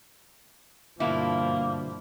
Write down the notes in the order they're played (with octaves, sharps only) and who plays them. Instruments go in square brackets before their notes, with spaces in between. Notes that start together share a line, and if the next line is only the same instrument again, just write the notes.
[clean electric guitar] D2 A#4 F5 [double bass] G2 F3 [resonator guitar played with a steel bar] B2 E4 [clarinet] A#3